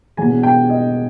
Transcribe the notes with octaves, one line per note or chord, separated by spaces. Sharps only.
E1 E2 B2 G#5
G5
D#5